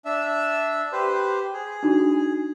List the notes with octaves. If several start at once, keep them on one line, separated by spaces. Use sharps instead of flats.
D4 E5
G4 B4 C5
G#4
D4 D#4 F#4